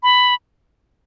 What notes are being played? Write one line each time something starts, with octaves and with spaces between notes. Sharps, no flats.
B5